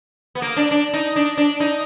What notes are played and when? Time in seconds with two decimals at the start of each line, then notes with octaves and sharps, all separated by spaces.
0.35 B3
0.42 A#3
0.56 D4
0.71 D4
0.94 D#4
1.16 D4
1.37 D4
1.60 D#4